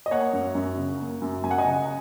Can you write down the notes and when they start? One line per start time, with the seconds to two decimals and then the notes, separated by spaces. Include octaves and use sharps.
0.06 D#5
0.11 A#3 C#5 F#5
0.33 F#2
0.55 F#2
0.77 C#3
1.00 A#3
1.22 F#2
1.44 F#2 G#5
1.51 F#5
1.58 D#5 G#5
1.65 C#3